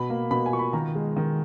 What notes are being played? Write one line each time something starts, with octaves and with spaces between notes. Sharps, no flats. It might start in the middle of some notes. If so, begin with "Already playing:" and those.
Already playing: B2 B5
A#3
B2 B5
G#5
F4 C#6
B5
D#3 A#5
G#3
D#3